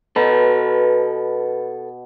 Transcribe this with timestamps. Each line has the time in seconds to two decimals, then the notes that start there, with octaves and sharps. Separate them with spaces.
0.16 B2 A4 B4